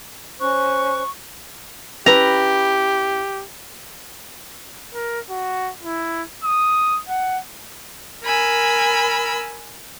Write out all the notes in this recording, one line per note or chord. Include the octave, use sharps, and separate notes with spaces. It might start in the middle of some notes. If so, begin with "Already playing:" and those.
C#4 C5 C#6 F#6
C#4 E4 G4 B4 A#5
A#4
F#4
E4
D#6
F#5
A#4 G#5 B5 E6